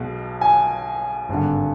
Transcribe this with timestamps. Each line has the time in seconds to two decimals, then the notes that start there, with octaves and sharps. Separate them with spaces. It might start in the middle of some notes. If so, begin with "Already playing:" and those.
Already playing: B1 B2 G#3
0.41 G#5
1.29 G#1 G2 D3